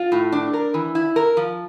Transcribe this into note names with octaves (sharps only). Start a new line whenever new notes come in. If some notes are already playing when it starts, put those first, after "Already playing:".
Already playing: F4
A2
D4
A#4
E3
E4
A#4
F3